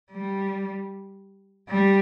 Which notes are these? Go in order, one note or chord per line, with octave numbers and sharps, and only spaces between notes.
G3
G3